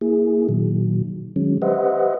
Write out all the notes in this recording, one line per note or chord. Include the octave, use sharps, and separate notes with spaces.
A#3 E4 G#4
A#2 D#3 F#3
D#3 F#3 G#3 C#4
G4 B4 C5 D#5 E5 F#5